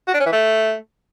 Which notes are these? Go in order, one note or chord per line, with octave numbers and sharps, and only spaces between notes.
F#4
D4
C#4
E3
A3